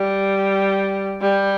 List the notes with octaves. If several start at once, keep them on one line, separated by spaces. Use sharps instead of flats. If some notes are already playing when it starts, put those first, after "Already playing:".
Already playing: G3
G3